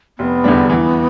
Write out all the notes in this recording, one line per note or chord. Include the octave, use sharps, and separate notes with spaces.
F1 B3
E2 D3 G3 D4
E3